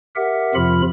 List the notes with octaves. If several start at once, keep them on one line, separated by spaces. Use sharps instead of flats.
G4 A#4 E5 F#5
F2 C3 F3 F4 B5 F6